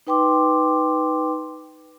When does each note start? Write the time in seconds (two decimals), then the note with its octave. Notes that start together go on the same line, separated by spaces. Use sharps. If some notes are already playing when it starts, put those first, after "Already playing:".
0.07 D#4 B4 G5 C6 D6